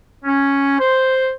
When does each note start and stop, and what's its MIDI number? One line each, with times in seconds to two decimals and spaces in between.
0.25 0.77 61
0.79 1.32 72